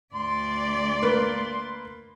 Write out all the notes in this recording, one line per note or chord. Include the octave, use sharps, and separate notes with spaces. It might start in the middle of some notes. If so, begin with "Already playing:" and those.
D2 D5 C6
A#3 B4